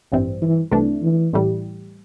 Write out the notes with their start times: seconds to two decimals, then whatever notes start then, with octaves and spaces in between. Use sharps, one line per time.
0.12 A1 G2 E3 G3 C4
0.42 E3
0.71 C2 C3 E3 A3 D4
1.02 E3
1.33 A1 A2 E3 G3